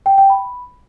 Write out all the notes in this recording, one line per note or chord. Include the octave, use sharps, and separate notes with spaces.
G5
G5
B5